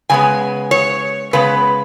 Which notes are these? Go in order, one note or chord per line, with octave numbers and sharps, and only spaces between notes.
C#3 G#3 B3 G#5
C#5
C#3 G#3 B3 B4